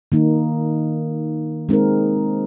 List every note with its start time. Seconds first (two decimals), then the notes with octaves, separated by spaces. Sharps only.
0.12 D#3 A#3 D#4
1.69 G#3 C4 D#4 A#4